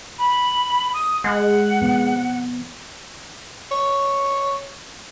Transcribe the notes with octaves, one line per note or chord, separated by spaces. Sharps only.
B5
D#6
G#3 F#5
F3 B3
C#5